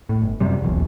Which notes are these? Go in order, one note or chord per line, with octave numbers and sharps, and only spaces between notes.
A2
G1
F#2 C3 G3
D#1 B1 E2